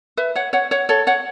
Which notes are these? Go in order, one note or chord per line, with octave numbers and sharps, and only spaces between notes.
B4 E5
C#5 F#5
C#5 F#5
C#5 F#5
A4 C#5
C#5 F#5